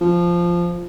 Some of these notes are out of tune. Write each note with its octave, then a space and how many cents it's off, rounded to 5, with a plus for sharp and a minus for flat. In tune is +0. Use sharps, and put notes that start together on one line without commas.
F3 -5